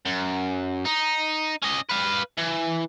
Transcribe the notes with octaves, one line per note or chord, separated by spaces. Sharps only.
F#2
D#4
C#4 D#5
B4 F5
E3